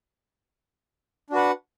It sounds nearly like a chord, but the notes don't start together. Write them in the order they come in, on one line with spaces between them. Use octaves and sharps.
D4 F#4 B4 F#5